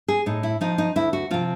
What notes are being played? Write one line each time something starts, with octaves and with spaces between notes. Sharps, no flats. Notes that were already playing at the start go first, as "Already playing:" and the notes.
G#4
A2 D#4
E4
F3 D#4
D#4
D2 E4
F#4
C3 F3 F4